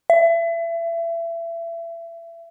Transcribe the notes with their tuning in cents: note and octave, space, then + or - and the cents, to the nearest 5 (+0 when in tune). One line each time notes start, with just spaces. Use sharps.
E5 +30